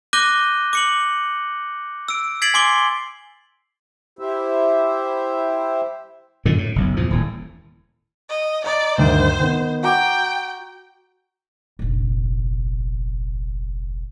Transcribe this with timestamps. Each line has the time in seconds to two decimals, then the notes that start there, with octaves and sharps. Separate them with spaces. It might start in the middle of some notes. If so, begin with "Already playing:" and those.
0.13 D6 F#6 G6 A#6 D#7 G7
0.73 D6 C#7 F#7
2.08 E6 D7
2.42 G#6 A6 B6 C7 D7 F#7
2.54 G#5 C6 D6 G7
4.19 E4 G4 C5 E5
6.45 F#2 A#2 D3 D#3
6.58 A2
6.76 F#1 B1
6.97 E2 A#2 F3
7.10 D#1 A2
8.29 D#5
8.64 D5 D#5 A#5
8.98 D2 G2 D#3 C5
9.40 D#3 B3
9.83 F#4 G5 A#5 D6
11.79 F1 A#1